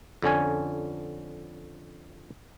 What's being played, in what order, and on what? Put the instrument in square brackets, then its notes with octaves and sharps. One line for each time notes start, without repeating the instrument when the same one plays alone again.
[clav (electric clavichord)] F2 D3 C#4 G#5